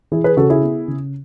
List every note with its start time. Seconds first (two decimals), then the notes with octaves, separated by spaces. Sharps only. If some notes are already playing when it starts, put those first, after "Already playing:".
0.12 E3 E4 G#4
0.24 G#4 B4
0.37 C#3 F#4 A4
0.50 E4 G#4
0.63 B3
0.88 C#3